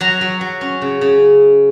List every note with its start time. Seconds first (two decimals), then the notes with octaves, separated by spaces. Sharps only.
0.01 F#3 A#5
0.21 F#3
0.41 F#3
0.61 C#4
0.82 C#3
1.01 C#3